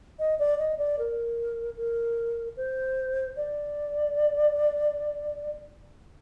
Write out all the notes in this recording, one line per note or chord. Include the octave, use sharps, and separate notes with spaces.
D#5
D5
D#5
D5
A#4
A#4
C5
D5